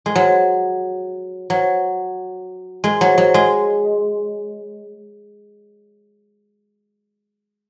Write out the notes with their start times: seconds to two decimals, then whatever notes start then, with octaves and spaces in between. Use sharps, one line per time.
0.06 G#3
0.15 F#3
1.50 F#3
2.84 G#3
3.01 F#3
3.18 F#3
3.34 G#3